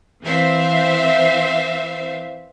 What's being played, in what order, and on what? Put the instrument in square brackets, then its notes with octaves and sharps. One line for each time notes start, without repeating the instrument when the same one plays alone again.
[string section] E3 C4 C5 E5 F5